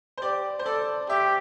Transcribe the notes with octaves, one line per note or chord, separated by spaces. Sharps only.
C5
G4 D5
C5
A4 D5
G4 E5